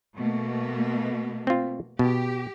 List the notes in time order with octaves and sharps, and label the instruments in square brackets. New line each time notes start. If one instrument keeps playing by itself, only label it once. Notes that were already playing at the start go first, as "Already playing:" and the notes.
[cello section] B2 A3 A#3
[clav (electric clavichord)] C4 F4
[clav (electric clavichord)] B2 [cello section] G4